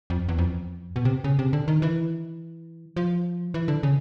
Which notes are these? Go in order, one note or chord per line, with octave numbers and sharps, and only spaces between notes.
F2
E2
F2
B2
C3
C#3
C3
D3
D#3
E3
F3
E3
D3
C#3